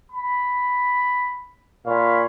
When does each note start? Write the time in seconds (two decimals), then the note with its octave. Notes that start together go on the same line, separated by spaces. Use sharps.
0.12 B5
1.86 A#2 C#5 F5 B5